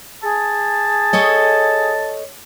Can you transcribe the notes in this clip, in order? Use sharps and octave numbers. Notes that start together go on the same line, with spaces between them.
G#4 A5
A4 C#5 D#5